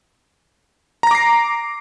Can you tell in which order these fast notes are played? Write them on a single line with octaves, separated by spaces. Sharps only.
A#5 A#6 D6 C7